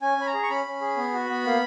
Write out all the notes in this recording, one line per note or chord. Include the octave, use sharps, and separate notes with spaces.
C#4 G#5
C#4 B5
A#5
G#4
C#6
C#4 B5
C#4
G#4
B3
F#4
B3
A#3